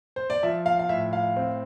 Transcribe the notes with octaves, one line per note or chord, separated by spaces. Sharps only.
C5
D5
F3 E5
F5
F5
A2 E5
F5
C4